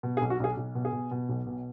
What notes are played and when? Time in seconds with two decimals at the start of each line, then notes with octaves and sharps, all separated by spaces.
0.03 B2
0.17 G#4
0.22 B1
0.30 F#4
0.40 B1 G#4
0.57 B1
0.75 B2
0.85 G#4
0.93 B2
1.11 B2
1.29 B1
1.47 B2